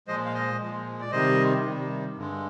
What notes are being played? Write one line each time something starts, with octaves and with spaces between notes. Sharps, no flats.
A#2 F3 G#3 C5 D#5
F5
C5 D#5
A#2 F3 G#3
D5
C3 D#3 G3 C5 D#5
C3 D#3 G3
G2 D3 G#3